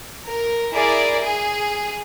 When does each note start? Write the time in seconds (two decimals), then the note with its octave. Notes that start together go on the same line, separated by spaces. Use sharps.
0.24 A#4
0.72 E4 G#4 A#4 D5
1.20 G#4